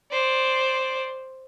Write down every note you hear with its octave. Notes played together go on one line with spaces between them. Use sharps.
C5 D5